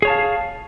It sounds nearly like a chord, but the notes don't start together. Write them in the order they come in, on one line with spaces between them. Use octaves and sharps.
G#4 C#5 A5 F5